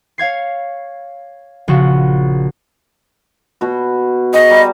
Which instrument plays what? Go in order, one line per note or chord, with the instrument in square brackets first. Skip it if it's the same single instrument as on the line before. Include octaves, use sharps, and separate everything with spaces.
[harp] C#5 F5 G#6 C7
A#1 C#3 F#4 E7
[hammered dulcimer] B2 F#4
[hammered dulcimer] G#4 C#6 [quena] D#5
[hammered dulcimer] G3 A#5